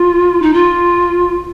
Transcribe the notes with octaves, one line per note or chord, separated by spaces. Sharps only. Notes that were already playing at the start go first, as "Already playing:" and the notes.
Already playing: F4
D#4
F4